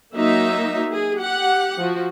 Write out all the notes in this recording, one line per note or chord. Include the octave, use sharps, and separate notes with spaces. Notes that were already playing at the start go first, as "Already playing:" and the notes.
F#3 A#3 D#4 E5
G#4
G4 F#5
F3 F#4